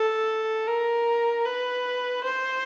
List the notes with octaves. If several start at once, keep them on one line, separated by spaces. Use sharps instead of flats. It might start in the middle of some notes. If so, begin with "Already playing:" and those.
Already playing: A4
A#4
B4
C5